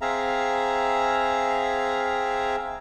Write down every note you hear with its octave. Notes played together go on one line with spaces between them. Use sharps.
C4 G#4 E5 F5 A#5